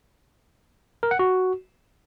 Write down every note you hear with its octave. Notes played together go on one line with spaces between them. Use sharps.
A#4
F#5
F#4